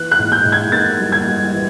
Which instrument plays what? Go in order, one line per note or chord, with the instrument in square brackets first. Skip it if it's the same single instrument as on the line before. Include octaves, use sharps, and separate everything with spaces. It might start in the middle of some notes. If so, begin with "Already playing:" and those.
Already playing: [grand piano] E3 [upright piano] F#6
[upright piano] F#6
[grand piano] G#2
[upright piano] G6
[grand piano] G#2
[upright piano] G#6
[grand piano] A#3 [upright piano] A6
[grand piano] G3
[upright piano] G#6
[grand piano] G3
E3